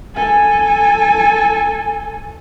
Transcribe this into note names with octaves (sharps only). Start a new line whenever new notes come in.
A4 G#5